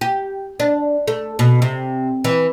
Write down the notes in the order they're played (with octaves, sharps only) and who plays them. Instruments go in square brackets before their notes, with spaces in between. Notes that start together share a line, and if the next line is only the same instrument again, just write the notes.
[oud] G4
D4
A3
B2
C3
E3